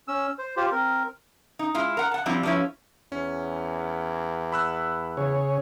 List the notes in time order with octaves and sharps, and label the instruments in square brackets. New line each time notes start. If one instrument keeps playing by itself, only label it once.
[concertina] C#4 E6
C5
F4 G4 C5
C4 A#4
[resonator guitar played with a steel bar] D#4
G#3 E4 F4
A#4 F#5
F#5 A5
F3 G3 C4 D4 E4
F3 G3 B3 C#4 E4
[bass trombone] E2 [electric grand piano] C#4
[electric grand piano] B5 E6 F#6
[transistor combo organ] C#3 G#4 C#5